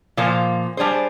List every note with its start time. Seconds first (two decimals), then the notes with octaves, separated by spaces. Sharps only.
0.17 A#2 F3 A#3
0.77 G3 D4 G#4 C5